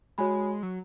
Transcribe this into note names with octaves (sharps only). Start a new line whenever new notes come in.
G#3 F#4 C#5 G#5 B5
F#3